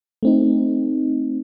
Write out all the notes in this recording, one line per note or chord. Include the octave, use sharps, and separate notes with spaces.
A3 C4 D#4